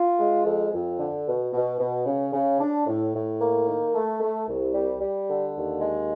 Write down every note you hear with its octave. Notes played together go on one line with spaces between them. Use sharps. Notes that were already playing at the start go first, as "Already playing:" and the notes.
Already playing: F4
G#3
F2
F2
D3
B2
B2
B2
C#3
C#3
D4
A2
A2
A#3
D#3
A3
A3
C2
G3
G3
D3
D#2
G#3